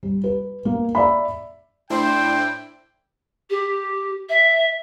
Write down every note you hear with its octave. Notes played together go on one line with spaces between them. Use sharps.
G3
B4
A#3
D5 E5 B5
A2 D4 E4 C5 G5
G4
E5